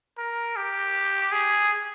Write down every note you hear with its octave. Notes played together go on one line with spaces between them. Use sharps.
A#4
G4
G#4